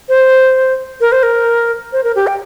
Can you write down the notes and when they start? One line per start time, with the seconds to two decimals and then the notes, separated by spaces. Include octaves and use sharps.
0.09 C5
1.01 A#4
1.12 C5
1.23 A#4
1.93 C5
2.04 A#4
2.16 G4
2.27 G5